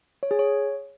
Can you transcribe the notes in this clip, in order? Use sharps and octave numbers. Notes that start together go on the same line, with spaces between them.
C#5
G#4
C#5